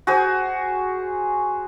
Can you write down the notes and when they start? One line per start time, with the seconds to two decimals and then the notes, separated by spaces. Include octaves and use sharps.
0.07 F#4 G#4 C5